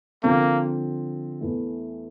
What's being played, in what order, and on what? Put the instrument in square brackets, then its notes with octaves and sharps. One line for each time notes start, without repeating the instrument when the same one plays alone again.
[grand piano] D3 F3 C4 [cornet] A#3
[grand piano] E2 E3 A3